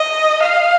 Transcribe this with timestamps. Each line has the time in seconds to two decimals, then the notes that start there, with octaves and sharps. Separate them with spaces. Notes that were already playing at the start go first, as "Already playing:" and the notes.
Already playing: D#5
0.43 F5